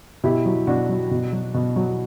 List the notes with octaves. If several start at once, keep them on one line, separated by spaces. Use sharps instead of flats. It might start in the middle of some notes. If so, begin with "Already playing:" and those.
B2 E4 G4
F#3
B2 D4 F#4
F#3
B2
F#3
B2
F#3